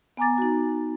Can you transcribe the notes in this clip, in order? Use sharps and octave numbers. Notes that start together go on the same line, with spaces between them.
B3 G#5 A#5 D6 A6
D#4 F#4